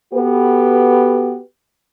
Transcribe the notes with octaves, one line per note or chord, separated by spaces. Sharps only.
B3 F#4 G4 A4 B4